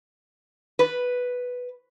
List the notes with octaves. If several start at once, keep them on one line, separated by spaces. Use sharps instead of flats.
B4